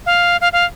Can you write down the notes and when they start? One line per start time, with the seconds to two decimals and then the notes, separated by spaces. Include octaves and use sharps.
0.06 F5
0.41 F5
0.53 F5